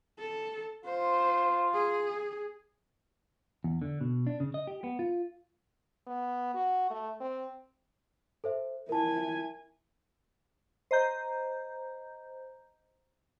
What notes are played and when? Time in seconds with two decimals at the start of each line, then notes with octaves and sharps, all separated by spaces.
0.19 A4
0.85 F4 C5
1.74 G#4
3.64 E2
3.82 D3
4.01 B2
4.27 D4
4.40 C#3
4.54 D#5
4.67 G4
4.84 B3
4.99 F4
6.07 B3
6.55 F#4
6.90 A3
7.21 C4
8.44 A4 C5 E5
8.89 E4 A#4 G#5 A5
10.91 C5 D#5 A#5 G6